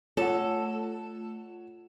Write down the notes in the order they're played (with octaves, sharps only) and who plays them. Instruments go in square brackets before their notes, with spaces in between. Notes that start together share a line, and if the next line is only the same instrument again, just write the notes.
[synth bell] A3 F4 E7 [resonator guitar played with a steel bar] A4 [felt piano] C#5 F#5